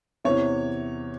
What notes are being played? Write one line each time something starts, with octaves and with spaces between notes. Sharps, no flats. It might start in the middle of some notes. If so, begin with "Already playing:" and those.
E2 C3 E3 C#5